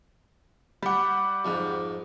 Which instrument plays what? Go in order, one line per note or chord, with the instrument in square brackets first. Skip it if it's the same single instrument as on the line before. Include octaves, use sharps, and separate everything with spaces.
[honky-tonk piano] G3 F#5 [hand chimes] B5 D6
[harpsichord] F2 G#2